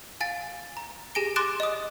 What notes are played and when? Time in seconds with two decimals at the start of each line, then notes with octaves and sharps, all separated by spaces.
0.20 F5 G#5 A6 D7
0.77 A#5
1.15 G4 G#4 G#5 A#6 D7 G7
1.36 C6 D6 F#6 A6 D7 E7
1.60 D#5 D#6